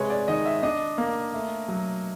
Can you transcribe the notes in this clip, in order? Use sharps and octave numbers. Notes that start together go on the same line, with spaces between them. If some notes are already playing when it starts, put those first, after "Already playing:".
Already playing: C3 G#3 B4 C#5
D5
D#3 D#5
E5
D4 D#5
A#3
A3
F#3